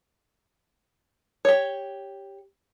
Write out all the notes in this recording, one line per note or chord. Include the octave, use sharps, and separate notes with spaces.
G4 C#5